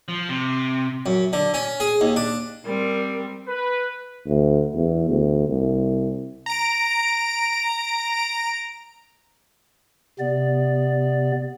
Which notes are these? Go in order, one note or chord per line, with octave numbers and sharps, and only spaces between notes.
F3
C3
F#2
D3
C#4
G#4
D#2
D4
G3 C4 A#4
B4
D2
E2
D2
C2
A#5 D7
C3 B3 D5